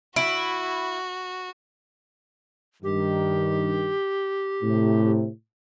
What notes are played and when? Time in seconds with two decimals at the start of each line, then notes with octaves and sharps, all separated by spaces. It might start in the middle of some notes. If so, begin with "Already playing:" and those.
0.16 E4 F#4 D7
2.83 G2 D#3 G4
4.63 A2 C3